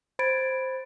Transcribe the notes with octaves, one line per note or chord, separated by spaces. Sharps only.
C5 B5 G#6 A6 D7